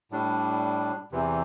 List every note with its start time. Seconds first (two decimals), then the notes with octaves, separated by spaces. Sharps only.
0.11 A2 G3 D4
1.12 E2 C3 E3